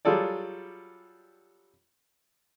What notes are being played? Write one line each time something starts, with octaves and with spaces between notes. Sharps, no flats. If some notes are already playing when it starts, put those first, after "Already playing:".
F#3 G3 F4 G#4 A4 D5